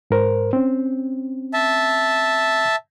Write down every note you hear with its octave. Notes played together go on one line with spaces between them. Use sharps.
G#2 A#4 C5
C4 C#4
E5 A5